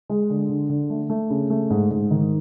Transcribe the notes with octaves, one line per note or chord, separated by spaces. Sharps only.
G#3
D3
D3
D3
A3
A3
C#3
A3
G#2
G#2
D#3